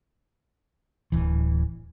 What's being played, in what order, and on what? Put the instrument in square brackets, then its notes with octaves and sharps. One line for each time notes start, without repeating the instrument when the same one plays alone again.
[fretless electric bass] D1 E3